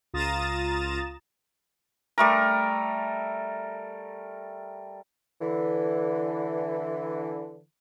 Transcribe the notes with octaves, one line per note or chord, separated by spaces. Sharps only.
C#2 F4 A#5 D#6 A6 E7
G3 A3 A#4
D3 E3